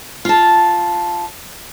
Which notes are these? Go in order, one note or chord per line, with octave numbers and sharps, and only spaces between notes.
F4 A5